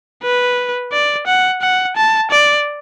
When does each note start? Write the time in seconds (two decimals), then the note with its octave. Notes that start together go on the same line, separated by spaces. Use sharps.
0.23 B4
0.92 D5
1.27 F#5
1.62 F#5
1.96 A5
2.31 D5